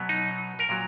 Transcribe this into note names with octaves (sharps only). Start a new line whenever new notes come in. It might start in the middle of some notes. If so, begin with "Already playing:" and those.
Already playing: B2 F#3 B3
D#4
A#4
A#2 F#3